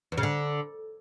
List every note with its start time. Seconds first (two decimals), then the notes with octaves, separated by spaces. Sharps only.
0.12 E2
0.18 C#3
0.23 D3